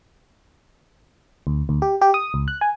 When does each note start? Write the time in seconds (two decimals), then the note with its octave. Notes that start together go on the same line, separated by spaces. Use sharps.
1.47 D2
1.69 D2
1.82 G4
2.01 G4
2.14 D#6
2.34 C#2
2.48 F#6
2.61 G#5